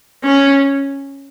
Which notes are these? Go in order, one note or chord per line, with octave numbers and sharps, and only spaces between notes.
C#4